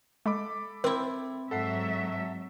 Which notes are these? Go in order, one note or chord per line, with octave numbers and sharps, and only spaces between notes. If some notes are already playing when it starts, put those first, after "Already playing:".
G#3 A4 B5 D6
C4 E4 A#4
G#2 F#3 A4 E5 F#5 C7